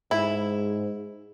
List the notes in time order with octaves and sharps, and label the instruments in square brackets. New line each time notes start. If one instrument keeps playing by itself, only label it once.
[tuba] G#2 [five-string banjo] E4